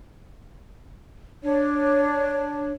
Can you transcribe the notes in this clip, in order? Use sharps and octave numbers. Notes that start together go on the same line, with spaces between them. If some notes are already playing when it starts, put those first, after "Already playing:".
D4 C#5